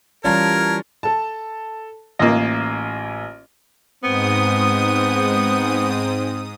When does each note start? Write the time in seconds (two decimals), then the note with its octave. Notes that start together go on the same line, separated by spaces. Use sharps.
0.24 E3 G3 C#4 F4 A#4 D5 A5 G#6
1.03 A4 A5
2.19 A1 A#3 F4 D#5
4.03 G#2 B3 C4 D#6